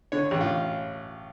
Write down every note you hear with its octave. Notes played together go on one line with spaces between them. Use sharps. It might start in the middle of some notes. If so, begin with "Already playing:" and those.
D3 C#5
A1
F4